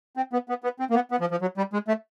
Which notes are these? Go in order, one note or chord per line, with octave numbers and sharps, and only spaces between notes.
C4
B3
B3
B3
C4
A#3
B3
B3
F3
F3
F#3
G3
G#3
A3